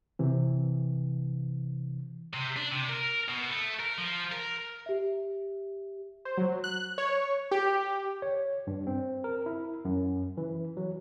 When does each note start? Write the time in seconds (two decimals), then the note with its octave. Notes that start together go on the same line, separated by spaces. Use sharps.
0.19 C3 E3
2.34 C3
2.57 D4
2.72 C3
2.89 A#4
3.28 B2
3.50 A3
3.80 A#4
3.98 F3
4.32 A#4
4.86 G4 E5
6.25 C5
6.37 F#3
6.64 F#6
6.98 C#5
7.51 G4
8.22 C#5
8.67 G2
8.87 C4
9.24 A#4
9.46 E4
9.85 F#2
10.37 E3
10.77 F#3